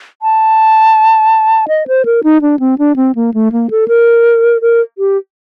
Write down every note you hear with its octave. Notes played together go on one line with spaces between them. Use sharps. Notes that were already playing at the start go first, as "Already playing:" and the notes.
A5
D#5
C5
A#4
D#4
D4
C4
D4
C4
A#3
A3
A#3
A4
A#4
A#4
G4